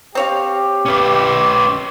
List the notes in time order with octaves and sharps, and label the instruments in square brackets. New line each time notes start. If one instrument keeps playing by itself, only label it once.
[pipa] C4 C#5 F5 [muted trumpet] G4
[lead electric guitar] C#4 B4 [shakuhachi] D6